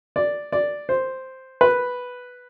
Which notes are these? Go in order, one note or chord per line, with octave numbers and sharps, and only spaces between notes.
D5
D5
C5
B4